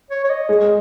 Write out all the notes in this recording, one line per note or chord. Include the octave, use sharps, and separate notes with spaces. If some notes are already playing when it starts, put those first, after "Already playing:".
C#5
C#5
D#5
G#3